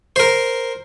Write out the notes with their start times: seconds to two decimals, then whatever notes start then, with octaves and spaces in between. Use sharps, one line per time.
0.16 A#4 C5